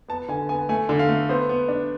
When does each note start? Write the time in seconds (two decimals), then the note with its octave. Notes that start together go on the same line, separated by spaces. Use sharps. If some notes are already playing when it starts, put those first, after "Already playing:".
0.08 B3 A5
0.28 D3 G#5
0.49 B3 G#5
0.69 A3 G#5
0.89 D3
0.99 F5
1.09 A3
1.29 B3 C5
1.49 B3
1.68 D4